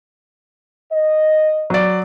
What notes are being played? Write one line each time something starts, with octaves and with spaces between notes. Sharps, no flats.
D#5
F#3 D5